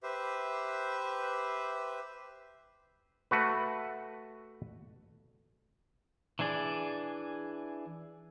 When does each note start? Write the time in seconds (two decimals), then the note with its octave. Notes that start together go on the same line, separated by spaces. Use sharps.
0.03 G4 B4 C5 E5
3.31 A3 F#4 B4
6.39 E3 D4 G#4 D5